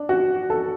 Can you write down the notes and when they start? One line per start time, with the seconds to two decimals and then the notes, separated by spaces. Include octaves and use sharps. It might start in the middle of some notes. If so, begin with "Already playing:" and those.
Already playing: D4
0.09 F#4
0.50 A4